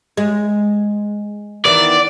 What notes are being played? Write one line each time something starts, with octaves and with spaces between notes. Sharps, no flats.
G#3
D#3 E3 B3 D5